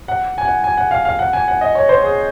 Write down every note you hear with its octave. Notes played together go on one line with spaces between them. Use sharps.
F#5
G#5
F#5
G#5
F#5
F5
F5
F#5
G#5
F#5
D#5
C#5
C5
G#4